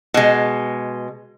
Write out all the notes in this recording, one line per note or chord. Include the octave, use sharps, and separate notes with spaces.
B2 G#3